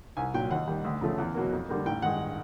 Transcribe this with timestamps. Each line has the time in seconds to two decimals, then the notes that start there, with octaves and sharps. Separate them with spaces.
0.17 C2 G#5
0.34 A#2 F#3 G5
0.51 D#2 F#5
0.68 D#3 G3
0.84 D2
1.01 C#3 F3 A3
1.18 E2
1.35 B2 F#3 A#3
1.53 F2
1.69 D3 G3 A#3
1.86 A1 G5
2.02 G2 D#3 G#3 F#5